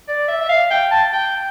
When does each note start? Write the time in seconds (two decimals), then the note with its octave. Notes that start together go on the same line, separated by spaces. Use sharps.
0.08 D5
0.28 E5
0.41 E5
0.49 F5
0.71 G5
0.91 A5
1.13 G5